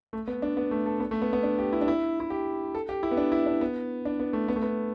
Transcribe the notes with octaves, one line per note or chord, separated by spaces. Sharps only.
A3
B3
D4
B3
A3
A4
B3
A3
B3
B3
D4
G4
E4
D4
E4
E4
G4
A4
G4
E4
B3
D4
E4
D4
B3
D4
B3
A3
B3
A3
B3